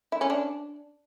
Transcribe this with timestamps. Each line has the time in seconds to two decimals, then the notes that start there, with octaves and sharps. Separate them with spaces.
0.12 E4
0.21 C#4
0.30 D4